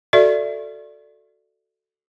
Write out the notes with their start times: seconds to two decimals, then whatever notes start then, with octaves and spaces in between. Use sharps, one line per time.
0.13 F#4 A4 D5 E5